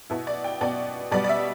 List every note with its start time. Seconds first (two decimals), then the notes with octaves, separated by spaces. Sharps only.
0.10 B2 B3 E4
0.27 D5
0.44 G5
0.61 B2 B3 D5
1.11 B2 G3 B3 D5
1.24 D5
1.29 E5